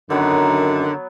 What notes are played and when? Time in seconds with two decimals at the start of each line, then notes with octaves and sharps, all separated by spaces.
0.10 F#2 D3 D#3 F#3 B3 C#5